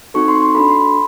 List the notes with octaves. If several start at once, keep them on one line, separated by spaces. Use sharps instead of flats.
C4 D#4 F#4 A4 C#6
C6
C6
D4 F#4 A4 B5
C6
B5